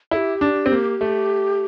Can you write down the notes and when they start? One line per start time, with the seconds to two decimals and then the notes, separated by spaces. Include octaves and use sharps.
0.11 E4 A4
0.17 G4
0.41 D4
0.66 C4
0.72 A#3
1.01 A3